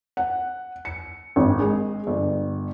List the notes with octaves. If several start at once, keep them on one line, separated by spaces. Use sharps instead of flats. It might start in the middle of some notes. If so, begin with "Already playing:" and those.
F#5
C#7
G#1
G#3
G1